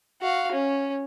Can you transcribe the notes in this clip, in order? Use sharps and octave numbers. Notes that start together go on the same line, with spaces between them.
F#4 F5
C#4